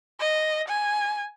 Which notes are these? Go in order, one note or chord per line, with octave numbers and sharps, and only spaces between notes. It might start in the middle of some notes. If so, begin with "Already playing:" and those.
D#5
G#5